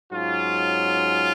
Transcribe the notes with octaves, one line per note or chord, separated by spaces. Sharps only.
G#2 F#3 C#4 F4